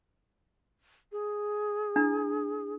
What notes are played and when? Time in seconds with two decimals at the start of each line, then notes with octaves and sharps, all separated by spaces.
1.12 G#4
1.96 D4 E4